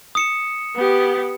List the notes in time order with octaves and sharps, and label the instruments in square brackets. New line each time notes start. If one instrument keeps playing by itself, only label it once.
[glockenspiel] D#6 C#7 E7
[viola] B3 G4